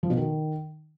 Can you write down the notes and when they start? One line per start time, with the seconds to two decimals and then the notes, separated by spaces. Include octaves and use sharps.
0.03 F3
0.10 B2
0.17 D#3